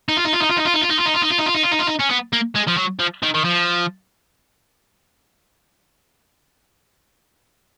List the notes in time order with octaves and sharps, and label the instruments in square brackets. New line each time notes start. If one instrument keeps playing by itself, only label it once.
[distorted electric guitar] D#4
F4
D#4
F4
D#4
F4
D#4
F4
D#4
F4
D#4
F4
D#4
F4
D#4
F4
D#4
F4
D#4
F4
D#4
F4
D#4
C#4
B3
A#3
G#3
F3
F#3
F3
D#3
D#3
F3